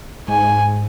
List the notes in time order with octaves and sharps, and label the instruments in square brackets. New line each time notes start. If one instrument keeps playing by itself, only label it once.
[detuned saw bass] G#2 [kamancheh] G#5